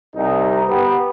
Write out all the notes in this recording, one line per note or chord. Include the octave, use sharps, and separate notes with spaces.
C2 D#4
B3 G4